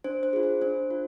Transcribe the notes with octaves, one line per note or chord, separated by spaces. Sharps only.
D4 C5
C5
F4 G#4
C5
D4 C5
F4